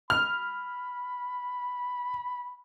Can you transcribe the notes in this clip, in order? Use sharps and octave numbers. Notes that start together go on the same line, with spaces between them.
B5 F6